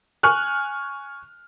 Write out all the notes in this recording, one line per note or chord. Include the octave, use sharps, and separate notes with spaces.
G#5 C#6 F6 F#6